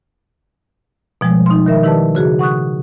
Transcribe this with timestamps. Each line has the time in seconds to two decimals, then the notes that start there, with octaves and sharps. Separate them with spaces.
1.21 B2 F3 G3 G#3
1.46 D#4 C6
1.66 D#3 A#4 E5
1.83 D#3 E4 G4 B4 D5 A5
2.15 C#3 F#4 G#4
2.39 F#5 C#6 D#6 F#6